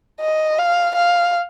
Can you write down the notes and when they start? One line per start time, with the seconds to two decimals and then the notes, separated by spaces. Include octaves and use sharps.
0.20 D#5
0.58 F5
0.96 F5